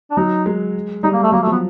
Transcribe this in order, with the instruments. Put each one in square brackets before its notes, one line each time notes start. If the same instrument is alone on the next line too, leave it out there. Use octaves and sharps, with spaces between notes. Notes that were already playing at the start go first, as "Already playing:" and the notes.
[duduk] D4
[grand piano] F#3 [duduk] D#4
[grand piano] G#3
[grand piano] G3 [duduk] D#4
[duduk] A#3
A3
[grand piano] F#3 [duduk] A#3
[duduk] A3
[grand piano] F3 [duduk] B3